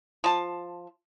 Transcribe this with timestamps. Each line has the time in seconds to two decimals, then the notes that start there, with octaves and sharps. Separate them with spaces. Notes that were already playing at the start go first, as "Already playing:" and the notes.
0.24 F3 A5